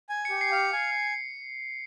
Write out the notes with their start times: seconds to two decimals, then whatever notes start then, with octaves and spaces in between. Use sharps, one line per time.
0.09 G#5
0.25 C#7
0.30 G4
0.41 C7
0.52 F5
0.57 C#7
0.73 G#5